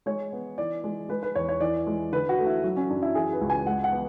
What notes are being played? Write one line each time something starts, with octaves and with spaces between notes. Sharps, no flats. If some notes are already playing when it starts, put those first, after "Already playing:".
G#3 C#5
B3
E3 D5
G#3
G#3 B4
B4
E2 C#5
C#5
E3 D5
G#3
D3 B4
F#4
A3
E4
F#3
C#4
F#2 D4
E4
E3 G#4
B4
C#2
G#5
G#3 F#5
F#5
B3